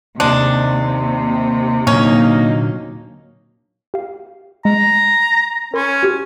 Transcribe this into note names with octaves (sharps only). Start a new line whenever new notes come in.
D#2 C3 G#3 D4
A#2 D3 F#3 A#3 C#4 D#4
G4 F5
G#3 A#5
C#4 A#4 B5 C6
F#4 G4